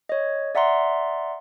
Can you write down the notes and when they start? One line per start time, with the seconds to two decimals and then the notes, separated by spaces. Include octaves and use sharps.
0.09 C#5 D#5
0.55 D5 E5 F#5 A#5 C6